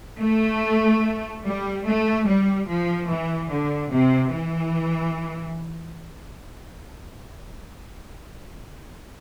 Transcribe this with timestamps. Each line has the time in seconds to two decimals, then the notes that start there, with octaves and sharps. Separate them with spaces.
0.20 A3
1.44 G3
1.86 A3
2.27 G3
2.68 F3
3.10 E3
3.51 D3
3.92 C3
4.33 E3